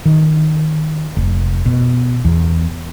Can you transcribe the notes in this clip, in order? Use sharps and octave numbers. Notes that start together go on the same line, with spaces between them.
D#3
F1
B2
E2